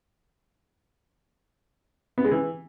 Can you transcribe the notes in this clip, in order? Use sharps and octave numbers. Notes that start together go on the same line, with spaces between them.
B3
G#3
E3